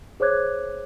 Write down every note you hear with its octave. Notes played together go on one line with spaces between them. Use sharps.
G#4 C5 C#5 D6 F#6 G#6